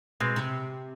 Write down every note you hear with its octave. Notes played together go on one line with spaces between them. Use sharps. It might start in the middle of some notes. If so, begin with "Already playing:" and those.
B2 G#3 C4
C3